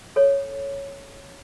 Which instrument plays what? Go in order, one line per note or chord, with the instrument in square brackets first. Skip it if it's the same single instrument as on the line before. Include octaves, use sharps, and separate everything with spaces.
[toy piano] A4 C#5